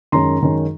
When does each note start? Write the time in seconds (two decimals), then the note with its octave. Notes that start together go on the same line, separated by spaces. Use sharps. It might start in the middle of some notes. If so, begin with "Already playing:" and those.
0.12 F#2 D#3 G#3 C#4 A#5 C6
0.41 F#2 D#3 G#3 C#4